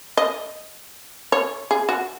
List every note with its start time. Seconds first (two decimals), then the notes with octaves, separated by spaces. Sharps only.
0.17 D#5
1.32 C#5
1.71 G#4
1.89 F#4